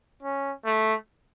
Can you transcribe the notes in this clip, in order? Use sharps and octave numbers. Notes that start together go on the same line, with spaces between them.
C#4
A3